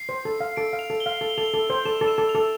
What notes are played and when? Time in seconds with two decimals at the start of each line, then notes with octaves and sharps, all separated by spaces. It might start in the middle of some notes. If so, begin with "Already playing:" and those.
Already playing: C7
0.09 C5
0.25 A4
0.40 F5
0.57 A4 D7
0.73 F5
0.79 F7
0.90 A4
1.00 G7
1.06 F5
1.21 A4
1.30 G7
1.38 A4 F7
1.46 G7
1.54 A4
1.70 C5
1.86 A4 E7
2.01 A4
2.08 E7
2.18 A4
2.29 F7
2.35 A4